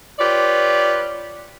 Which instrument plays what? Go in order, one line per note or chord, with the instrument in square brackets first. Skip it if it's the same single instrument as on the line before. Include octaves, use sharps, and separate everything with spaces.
[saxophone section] F4 G4 B4 C#5 D5